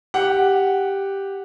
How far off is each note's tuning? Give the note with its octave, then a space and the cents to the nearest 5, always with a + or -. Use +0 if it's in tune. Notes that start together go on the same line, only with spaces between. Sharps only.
G4 +0 F#5 +0